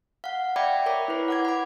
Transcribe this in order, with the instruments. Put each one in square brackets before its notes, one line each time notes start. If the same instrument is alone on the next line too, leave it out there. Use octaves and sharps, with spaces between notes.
[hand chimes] F5 F#5
D5 E5 G5 B5 D6 G#6
A#4 C#5 B5 D6
E4 B4
F#5 D6 G#6
B5 D6